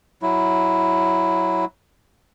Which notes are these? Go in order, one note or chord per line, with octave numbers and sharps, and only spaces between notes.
F#3 E4